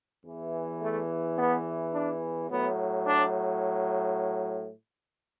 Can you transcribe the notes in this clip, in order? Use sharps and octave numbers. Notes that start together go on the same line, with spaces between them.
E2 E3
A3
B3
D4
A2 F#3 B3
D4